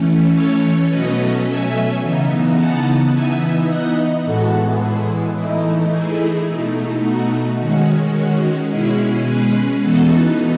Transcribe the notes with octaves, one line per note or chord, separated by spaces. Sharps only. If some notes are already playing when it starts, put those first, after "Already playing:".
Already playing: E3 A3 C#4
A4 C#5
B2 F#3 A3 C#4 B4 D#5
E5 G#5
C#3 E3 B3 D#4
F#5 A5
E3 B3 D#4 E5 G#5
D#5 F#5
A2 E3 G#3 B3 F#4 A4
E4 G#4
E3 A3 D#4 E4
E4 G#4
B2 A3 D#4
F#4
D#3 G#3 C#4 F#4
F#4
B2 G#3 C#4 E4 G#4
G#4 B4
E3 B3 D#4 F#4 A4